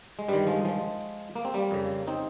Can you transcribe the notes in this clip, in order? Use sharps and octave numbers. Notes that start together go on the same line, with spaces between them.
G#3
G2 D#3 G3
F3 G#3
F3 G#3
A#3
C4
G3 A#3
F2 C#3
C4 D#4